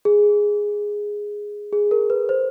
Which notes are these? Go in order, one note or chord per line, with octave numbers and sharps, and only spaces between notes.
G#4
G#4
A#4
B4
C5